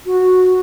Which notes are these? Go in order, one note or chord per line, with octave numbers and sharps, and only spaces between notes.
F#4